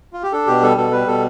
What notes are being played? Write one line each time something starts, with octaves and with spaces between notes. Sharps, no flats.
F4
G4
D4 A4
B2 G4
G3 A4
B2 A4
G3 B4
B2 A4